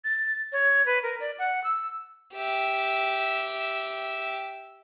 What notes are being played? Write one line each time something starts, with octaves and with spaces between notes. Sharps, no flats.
A6
C#5
B4
A#4
D5
F#5
E6
G4 E5